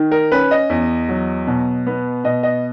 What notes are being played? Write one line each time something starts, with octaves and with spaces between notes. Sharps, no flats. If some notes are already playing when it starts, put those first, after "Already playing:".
Already playing: D#3
A#4
C#4 B4
D#5
E2
F#3
B2
B3
B2 D#5
D#5